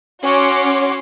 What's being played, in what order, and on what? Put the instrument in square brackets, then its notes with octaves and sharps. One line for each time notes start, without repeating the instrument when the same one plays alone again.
[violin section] C#4 F#4 C#5 C6 D6